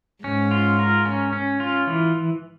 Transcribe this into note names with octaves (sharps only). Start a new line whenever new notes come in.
G#2 C#4
F4
A#4
C#4
C#4
F4
E3